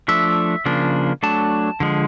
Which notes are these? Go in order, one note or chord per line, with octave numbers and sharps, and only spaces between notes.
F3 A3 D4 E5
C#3 F3 A#3 D4
F#3 A3 D4 A5
D3 F3 G#3